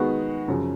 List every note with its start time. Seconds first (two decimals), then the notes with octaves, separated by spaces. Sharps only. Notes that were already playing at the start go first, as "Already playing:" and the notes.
Already playing: D#3 G#3 B3 F#4
0.48 F#2 C#3 F3